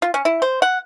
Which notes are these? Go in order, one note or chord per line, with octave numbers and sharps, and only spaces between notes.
F4
C#4
E4
C5
F#5